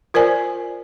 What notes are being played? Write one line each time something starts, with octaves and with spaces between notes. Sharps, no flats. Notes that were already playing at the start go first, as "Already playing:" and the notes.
F4 A#4 C5 D5 G#5